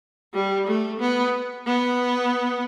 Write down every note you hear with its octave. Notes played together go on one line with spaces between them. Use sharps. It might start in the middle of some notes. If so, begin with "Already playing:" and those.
G3
A3
B3
B3